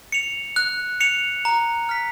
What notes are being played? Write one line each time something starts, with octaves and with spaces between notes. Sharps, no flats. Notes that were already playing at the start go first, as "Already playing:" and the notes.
C#7 F7
F#6
C#7 F7
A#5
F6 B6